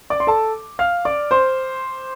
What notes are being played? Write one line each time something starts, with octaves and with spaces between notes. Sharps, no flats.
D5 D6
C6
A4 A5
F5 F6
D5 D6
C5 C6